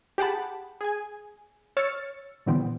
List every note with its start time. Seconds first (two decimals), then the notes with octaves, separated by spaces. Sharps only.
0.18 G4 G#4 F#5 A5 B5
0.81 G#4 G#5
1.77 C#5 E6 F6 A6 C#7
2.46 A#2 D3 E3 G3 B3 C4